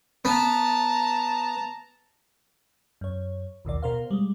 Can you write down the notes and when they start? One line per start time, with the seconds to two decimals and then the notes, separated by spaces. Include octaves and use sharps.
0.25 B3 A5 A#5
3.01 F#2 C#5
3.65 A#1 D#2 B2 D5
3.83 B2 A#4 C5 F5
4.11 G3 G#3